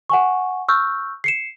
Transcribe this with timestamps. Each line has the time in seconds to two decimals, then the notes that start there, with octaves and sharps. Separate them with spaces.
0.10 F#5 G#5 C#6
0.68 C#6 E6 F6 G6
1.24 C7 C#7 E7